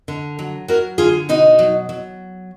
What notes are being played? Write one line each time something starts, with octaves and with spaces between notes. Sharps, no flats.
D3
F#3
F#3 F#4 A#4
D3 F4 G#4
B2 D#4 F#4
F#3
F#3